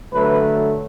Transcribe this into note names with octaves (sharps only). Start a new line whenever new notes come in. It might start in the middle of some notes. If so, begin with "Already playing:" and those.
D3 F#3 A3 B4